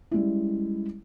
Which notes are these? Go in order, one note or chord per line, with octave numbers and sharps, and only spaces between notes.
G3 G#3 C#4 E4